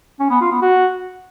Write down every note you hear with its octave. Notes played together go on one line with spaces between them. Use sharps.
C#4
B3
F4
B3
F#4